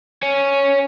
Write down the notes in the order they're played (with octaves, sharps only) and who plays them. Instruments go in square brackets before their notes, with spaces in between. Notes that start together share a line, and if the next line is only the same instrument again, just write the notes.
[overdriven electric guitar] C#5 G#5